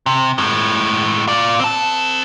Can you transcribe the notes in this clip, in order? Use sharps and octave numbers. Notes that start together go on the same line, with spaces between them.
C3
A2 G#3
F4 D5
C4 A5